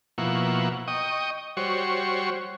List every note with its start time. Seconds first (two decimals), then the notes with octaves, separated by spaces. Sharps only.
0.18 B2 F3 A#3 E4 F#5 C#6
0.88 D#5 G5 C#6 D#6
1.57 G3 F#4 C5 C#5 C#6